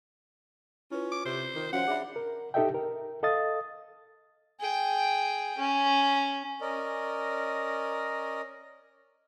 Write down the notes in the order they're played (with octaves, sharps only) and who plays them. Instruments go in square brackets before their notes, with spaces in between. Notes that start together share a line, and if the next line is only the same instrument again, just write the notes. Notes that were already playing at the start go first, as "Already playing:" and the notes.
[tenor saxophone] C#4 [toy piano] E4 B4 [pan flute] F4
[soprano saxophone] D6
[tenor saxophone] C3 [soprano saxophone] C5
[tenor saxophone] D#3
[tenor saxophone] F3 [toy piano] C#4 F#4 F5 [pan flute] C#5 [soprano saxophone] F#5
[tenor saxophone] D4 [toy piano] G#4 E5 B5
[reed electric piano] A#4
D#4 G4 A4 D#5 E5 G5
A#4
A4 D#5 F5 D#6 A6
[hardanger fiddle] G#4 G5
C#4
[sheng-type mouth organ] C#4 A#4 D5 D#5